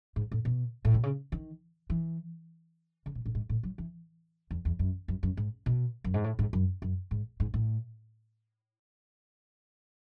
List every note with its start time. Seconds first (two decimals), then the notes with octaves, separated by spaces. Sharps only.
0.16 G#2
0.32 A2
0.45 B2
0.85 A2
0.94 B2
1.03 C#3
1.32 D#3
1.90 E3
3.06 C#3
3.15 B2
3.26 A2
3.35 G#2
3.49 A2
3.63 F#3
3.78 E3
4.51 E2
4.65 E2
4.79 F#2
5.08 F#2
5.23 F#2
5.37 G#2
5.66 B2
6.04 F#2
6.14 G#2
6.24 A2
6.39 G#2
6.53 F#2
6.82 F#2
7.11 G#2
7.40 G#2
7.54 A2